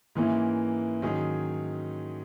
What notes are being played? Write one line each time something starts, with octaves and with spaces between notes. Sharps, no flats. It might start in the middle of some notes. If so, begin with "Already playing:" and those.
G#2 E3 A#3 C#4 E4
G#2 D#3 F#3 C#4 G#4